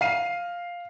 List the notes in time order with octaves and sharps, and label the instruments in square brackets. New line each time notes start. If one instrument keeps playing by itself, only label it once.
[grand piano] F5 C7 D#7